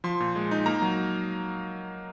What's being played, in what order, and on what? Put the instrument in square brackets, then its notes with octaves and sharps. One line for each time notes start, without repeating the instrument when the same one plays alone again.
[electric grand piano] F3 C6
A#2
G#3
D#4
A#3 A#5
F#3